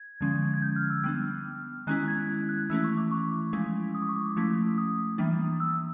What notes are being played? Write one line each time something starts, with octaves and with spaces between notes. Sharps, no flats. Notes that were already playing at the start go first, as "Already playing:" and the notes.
Already playing: G#6
D3 F3 G#3 C#4
G#6
G6
F6
E6
G3 B3 D4 F6
D#3 G#3 C#4 E4 F#6
G#6
F#6
E3 A3 C#4 E4 E6
C#6
D6
C#6
F3 G#3 C#4 E4
D#6
D6
C#6
D6
F3 A3 C#4 E4
D#6
E3 G3 A#3 D4
E6